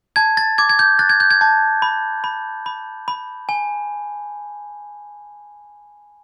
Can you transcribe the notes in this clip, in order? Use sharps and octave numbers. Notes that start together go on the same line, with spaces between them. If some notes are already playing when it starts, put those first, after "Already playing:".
A5 G#6
A6
D6 G#6
G#6
G6
F#6 A6
G#6
G6
G#6
A5
B5
B5
B5
B5
G#5